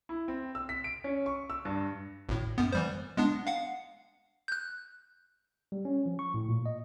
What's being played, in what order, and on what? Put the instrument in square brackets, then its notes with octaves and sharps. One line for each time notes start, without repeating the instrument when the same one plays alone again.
[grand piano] E4
C4
E6
B6
D7
C#4
C#6
E6
G2
[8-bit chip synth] G#1 A2
F#2 B3
E3 G3 C5
G#3 B3 D4
F5 F#5
F#6 G6
[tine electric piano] G3
C#4
F3
C#6
A2
A#2
D#5